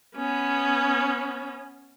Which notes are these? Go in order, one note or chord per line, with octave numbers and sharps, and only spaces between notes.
B3 C#4